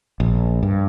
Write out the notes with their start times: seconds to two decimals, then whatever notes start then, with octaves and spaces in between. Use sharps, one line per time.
0.20 A#1
0.63 G2